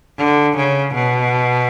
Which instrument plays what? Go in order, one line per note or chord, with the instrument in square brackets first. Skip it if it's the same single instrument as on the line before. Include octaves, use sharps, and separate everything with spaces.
[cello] D3
C#3
B2